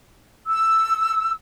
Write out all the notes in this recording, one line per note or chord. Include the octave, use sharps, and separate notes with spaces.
E6